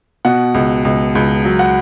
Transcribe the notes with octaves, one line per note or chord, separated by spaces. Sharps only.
B2 F#5
C#2
C#2
C#2
F#3
F#5